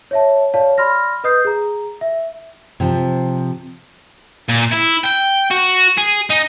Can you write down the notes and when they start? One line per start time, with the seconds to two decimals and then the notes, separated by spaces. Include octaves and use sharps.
0.11 C#5 E5 A5
0.54 C#5 D5 F5 A5
0.78 D5 B5 C6 F6 A#6
1.24 B4 D#5 D#6 G6 C7
1.45 G#4 A#5
2.01 E5
2.80 C3 F3
4.49 A#2
4.73 E4
5.05 G5
5.51 F#4
5.97 G#4
6.30 D#4